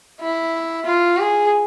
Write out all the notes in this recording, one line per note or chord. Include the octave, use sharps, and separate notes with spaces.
E4
F4
G#4